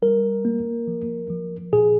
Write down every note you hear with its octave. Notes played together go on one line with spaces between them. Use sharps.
G3 A#4
A#3
F3
F3
A#2 G#4